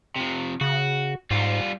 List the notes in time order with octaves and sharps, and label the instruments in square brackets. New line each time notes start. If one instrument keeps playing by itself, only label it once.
[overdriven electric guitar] C3 F3
[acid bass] C#3 [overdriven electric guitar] F#4
[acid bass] G#2 [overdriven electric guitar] G3 F4